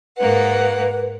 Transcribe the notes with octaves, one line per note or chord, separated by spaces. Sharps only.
G#2 A#3 B4 F#5